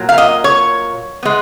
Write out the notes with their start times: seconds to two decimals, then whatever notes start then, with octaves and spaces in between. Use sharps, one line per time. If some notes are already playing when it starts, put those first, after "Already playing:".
Already playing: A#2 F#3
0.09 F5
0.18 D#5
0.44 C#5
1.23 G#3 B3